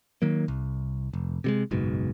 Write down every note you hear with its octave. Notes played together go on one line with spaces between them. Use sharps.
D#3 F#3 A#3
C2
F1
C3 G3 G#3
F#1 B1 G#2 B2